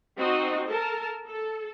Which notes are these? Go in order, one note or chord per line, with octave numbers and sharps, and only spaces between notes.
C4 D#4 F#4 D#5
A4 A#4 A5
A4